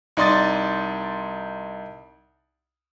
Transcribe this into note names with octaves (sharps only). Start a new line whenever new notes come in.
C2 D#4 D5 C6 D#6 A6